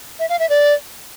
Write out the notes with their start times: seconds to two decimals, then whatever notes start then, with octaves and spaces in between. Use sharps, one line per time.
0.19 E5
0.29 F5
0.39 E5
0.49 D5